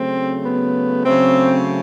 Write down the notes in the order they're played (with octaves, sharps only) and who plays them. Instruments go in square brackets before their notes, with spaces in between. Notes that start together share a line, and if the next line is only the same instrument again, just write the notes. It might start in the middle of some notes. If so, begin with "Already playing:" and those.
Already playing: [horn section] C#3 F#3 A3 C4
B3
C#3 F#3 A3 C4